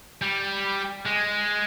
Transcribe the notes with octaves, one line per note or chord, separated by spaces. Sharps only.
G3
G#3